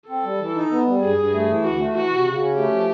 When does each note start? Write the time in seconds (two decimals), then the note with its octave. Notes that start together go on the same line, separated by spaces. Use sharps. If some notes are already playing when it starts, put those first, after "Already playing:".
0.09 C4 A4
0.24 G3
0.40 E3
0.56 D#4
0.71 B3
0.87 G3
1.01 G2 G#4
1.18 G2
1.33 A3
1.48 E3
1.64 D2 F#4
1.79 A3
1.94 E3 F#4
2.10 C3
2.26 C#3
2.41 C#4
2.56 A3 G4
2.71 F3